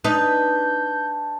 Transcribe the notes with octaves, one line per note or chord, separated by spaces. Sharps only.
D4 D#4 B4 G6